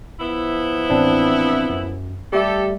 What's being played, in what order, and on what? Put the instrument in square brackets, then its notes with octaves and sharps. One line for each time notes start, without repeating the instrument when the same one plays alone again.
[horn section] F3 B3 E4
[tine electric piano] A1 C4 D4
F#2
[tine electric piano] G3 A3 [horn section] G4 A4